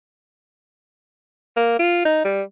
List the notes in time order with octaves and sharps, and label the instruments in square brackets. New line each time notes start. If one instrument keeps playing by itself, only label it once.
[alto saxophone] A#3
F4
D#4
G3